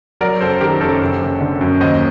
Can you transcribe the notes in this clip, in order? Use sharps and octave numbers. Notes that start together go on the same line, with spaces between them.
F#3 A#4 D5
F#1 A4 C5
D#3 G4 A#4
F#2 A4 C5
F#1
F#1
D3
F#2
D#2 C5 D#5